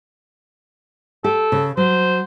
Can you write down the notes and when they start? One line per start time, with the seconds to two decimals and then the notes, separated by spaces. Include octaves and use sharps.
1.24 G4 A4
1.52 C#3
1.77 F#3 C5